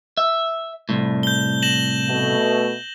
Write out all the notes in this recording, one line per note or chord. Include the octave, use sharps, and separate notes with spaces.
E5
C2 A2
G6 G7
A#6 E7 F#7
B2 A3